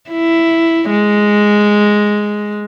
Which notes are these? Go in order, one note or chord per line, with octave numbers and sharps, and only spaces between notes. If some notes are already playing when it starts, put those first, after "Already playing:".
E4
G#3